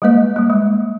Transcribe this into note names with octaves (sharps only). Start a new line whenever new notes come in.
G3 G#3 A#3 B4 D#5
G3 A#3
G#3